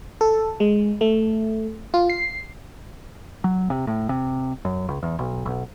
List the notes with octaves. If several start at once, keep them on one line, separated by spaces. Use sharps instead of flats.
A4
G#3
A3
F4
C7
F#3
C3
A2
C3
F#2
C#2
E2
B1
B1